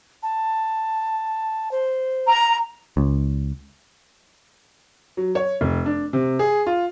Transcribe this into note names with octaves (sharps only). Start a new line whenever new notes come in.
A5
C5
A#5
C#2
F#3
C#5
F1
D4
C3
G#4
F4